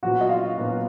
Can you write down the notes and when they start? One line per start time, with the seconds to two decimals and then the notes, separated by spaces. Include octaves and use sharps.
0.03 A#2 F#3 B3 F#4 F#5
0.21 D#5
0.29 F4 F5
0.57 A#2 F#3 B3